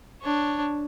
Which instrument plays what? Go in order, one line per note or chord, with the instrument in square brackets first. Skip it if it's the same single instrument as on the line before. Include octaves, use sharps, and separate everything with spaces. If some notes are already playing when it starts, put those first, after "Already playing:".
[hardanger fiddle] D4 C#5